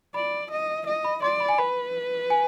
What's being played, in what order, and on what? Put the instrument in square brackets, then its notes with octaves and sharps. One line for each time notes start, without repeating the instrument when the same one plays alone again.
[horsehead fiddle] D5 [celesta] B5
[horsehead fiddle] D#5
D#5
[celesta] B5
[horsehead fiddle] D5 [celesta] C6
[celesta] B5
G#5
[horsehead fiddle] B4 [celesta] B5
[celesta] G#5